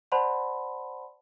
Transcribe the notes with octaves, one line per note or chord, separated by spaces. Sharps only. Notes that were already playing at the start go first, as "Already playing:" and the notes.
C5 D5 F#5 A5 B5 C6